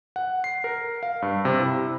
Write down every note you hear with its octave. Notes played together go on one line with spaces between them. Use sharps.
F#5
C7
A#4
F5
G2
C3
E4